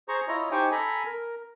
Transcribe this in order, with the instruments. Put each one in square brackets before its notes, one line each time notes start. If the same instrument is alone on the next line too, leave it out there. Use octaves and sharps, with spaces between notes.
[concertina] G#4 C5 A#5 C#6
E4 F4 C#5 D#5 A#5
D#4 G4 C5 G5 G#5 C#6
A4 G#5 A#5 B5
A#4